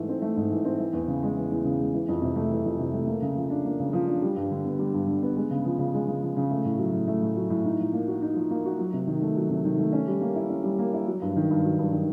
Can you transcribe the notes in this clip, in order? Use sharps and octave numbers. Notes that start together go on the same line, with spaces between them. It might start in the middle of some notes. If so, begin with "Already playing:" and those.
Already playing: G#2 E3 A3
C4
A3
G#2
E3
C4
E3
E2
C#3
G#3
E3
E2
C#3
G#3
E3
F2
C3
A3
E3
F2
C3
A3
A#3
C#3
F3
D4
A#3
C#3
F3
D4
G3
G2
D3
B3
G3
G2
D3
B3
G#3
C#3
F3
C#3
G#3
C#3
F3
C#3
A3
A2
F#3
A2
A3
A2
F#3
A2
D#4
F3
A#3
F#4
D#4
F3
A#3
F#4
F#3
C3
D#3
A3
F#3
C3
D#3
A3
C#4
G3
A#3
E4
C#4
G3
A#3
E4
F#3
G2
D#3
G2
F#3
G2
D#3